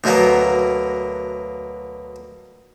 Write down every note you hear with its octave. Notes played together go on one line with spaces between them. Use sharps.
D2 B2 F#3 A#3 B3